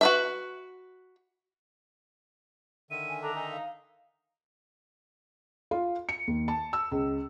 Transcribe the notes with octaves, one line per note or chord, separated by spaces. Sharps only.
F#4 B4 E5
D3 D#3 E5 D#7
G#5
D4 A4 A#5
D#4 G#5
F5
F4
C#7
D#2
A5
E6
C#2